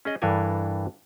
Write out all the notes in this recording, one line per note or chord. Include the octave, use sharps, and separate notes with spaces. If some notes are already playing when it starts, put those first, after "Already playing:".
C#4 G#4 D#5
G2 E3 D4 A4 A#4 G#5